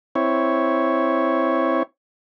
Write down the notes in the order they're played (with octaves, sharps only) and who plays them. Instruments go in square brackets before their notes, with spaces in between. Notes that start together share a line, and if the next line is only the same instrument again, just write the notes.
[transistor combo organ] C4 E4 C#5